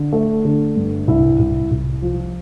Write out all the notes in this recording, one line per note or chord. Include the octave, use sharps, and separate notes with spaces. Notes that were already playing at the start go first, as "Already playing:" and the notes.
Already playing: D3
A3
D3
G2
C2 E4 E5
C2
C2
F3